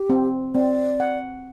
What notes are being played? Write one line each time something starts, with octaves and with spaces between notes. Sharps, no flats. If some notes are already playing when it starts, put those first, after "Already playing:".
Already playing: G4
C4
C4 D5
F#5